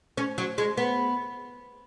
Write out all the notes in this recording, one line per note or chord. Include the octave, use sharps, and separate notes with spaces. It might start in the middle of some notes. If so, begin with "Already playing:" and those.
C#4
F#3
G#3
B3